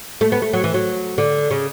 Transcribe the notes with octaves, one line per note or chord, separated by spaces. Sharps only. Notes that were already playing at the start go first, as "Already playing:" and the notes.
A3
B3
A3
F#3
E3
F#3
D3
C#3